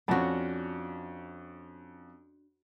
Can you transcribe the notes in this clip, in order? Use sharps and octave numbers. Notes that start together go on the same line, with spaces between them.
F2 C#4 D4 F#4